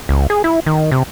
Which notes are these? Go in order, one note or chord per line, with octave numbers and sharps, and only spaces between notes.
C#2
G#4
E4
D#3
C3